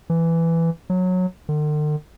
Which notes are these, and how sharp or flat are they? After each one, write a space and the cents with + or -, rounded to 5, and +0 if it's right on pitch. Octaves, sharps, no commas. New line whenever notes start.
E3 +10
F#3 -15
D3 +45